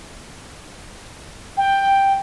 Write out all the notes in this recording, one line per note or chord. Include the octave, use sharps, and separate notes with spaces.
G5